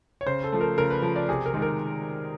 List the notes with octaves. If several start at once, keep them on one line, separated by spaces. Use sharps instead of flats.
C#5
C#3 C5
A4
F3 A3
A#4
C#3 A#4
B4
F3 A3
D5
C3 G#4
A#4
D#3 G#3
A#4